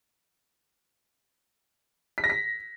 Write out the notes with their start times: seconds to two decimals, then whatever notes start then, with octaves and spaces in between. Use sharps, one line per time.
2.18 B6
2.24 A#6
2.30 B6